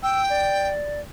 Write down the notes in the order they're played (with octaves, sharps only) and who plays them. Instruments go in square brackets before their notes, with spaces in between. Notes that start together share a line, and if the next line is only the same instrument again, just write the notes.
[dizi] G5 [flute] E6
[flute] D5